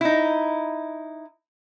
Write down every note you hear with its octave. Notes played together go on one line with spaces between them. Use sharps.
D#4 E4